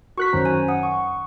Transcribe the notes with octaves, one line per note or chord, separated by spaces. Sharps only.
F#4 A#4 C#6 F#6 B6
F#2 D#3 C#4 C5 A#5
G#5
F#5 D#6
C#6